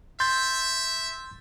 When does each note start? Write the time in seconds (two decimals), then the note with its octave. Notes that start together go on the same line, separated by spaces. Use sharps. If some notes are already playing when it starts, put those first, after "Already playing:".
0.20 E5 C6 G6 A6